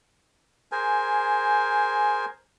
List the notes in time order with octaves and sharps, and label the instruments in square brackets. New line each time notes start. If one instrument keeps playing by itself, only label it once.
[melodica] G#4 A#4 C5 G#5